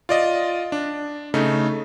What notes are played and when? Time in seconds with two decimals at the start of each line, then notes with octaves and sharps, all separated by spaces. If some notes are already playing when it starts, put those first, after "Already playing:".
0.09 F4 D5 D#5
0.72 D4
1.34 C#3 A3 D#4